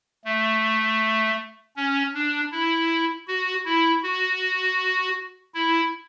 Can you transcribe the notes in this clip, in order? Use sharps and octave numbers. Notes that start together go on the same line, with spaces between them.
A3
C#4
D4
E4
F#4
E4
F#4
E4